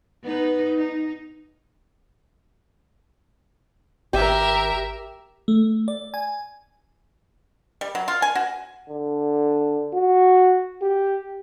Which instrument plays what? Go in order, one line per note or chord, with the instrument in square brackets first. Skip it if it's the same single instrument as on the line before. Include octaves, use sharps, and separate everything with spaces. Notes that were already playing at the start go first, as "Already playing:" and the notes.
[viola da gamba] B3 D#4 B4
D#4
[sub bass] G#1 [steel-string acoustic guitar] G4 [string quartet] A#4 E5
[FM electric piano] A3
D5
G#5
[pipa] G3
F#3
F4
G#5
F#4
[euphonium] D3
F#4
G4